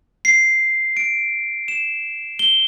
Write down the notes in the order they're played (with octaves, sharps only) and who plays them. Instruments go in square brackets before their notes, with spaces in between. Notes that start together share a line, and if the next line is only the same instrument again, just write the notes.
[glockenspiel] C7
D7
E7
G7